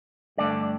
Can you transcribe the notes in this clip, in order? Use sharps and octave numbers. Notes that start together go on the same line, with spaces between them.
G2 D3 A3 D5